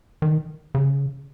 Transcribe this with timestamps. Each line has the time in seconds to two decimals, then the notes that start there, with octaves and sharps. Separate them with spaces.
0.22 D#3
0.75 C#3